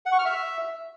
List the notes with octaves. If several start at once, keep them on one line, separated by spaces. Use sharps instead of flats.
F#5
C#6
F6
E5